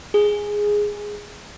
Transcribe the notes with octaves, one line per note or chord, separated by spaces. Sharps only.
G#4